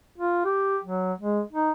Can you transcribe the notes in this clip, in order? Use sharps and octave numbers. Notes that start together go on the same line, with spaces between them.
F4
G4
F#3
G#3
D#4